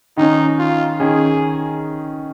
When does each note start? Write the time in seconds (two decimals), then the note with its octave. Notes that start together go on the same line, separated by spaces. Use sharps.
0.17 D#3 C#4 D#4
0.59 F4
0.99 D#3 C#4 G#4